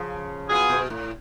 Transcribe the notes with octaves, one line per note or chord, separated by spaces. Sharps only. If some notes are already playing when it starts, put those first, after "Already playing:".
Already playing: C#3 F3
F#3 B3 F4 G#4
B2
A2